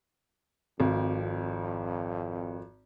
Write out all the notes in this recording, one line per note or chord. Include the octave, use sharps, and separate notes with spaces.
G#1 F2